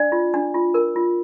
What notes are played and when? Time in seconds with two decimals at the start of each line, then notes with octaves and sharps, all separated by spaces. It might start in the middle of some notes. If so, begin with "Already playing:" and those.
Already playing: D4 D5
0.12 F4
0.34 D4
0.54 F4
0.74 A#4
0.96 F4